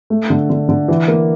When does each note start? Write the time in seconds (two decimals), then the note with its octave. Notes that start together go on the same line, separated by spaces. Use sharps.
0.10 A3
0.30 D3
0.50 D3
0.69 D3
0.88 E3
1.08 A#3